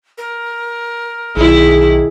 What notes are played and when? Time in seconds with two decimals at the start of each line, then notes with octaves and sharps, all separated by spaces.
0.18 A#4
1.37 B1 D#3 E4 G#4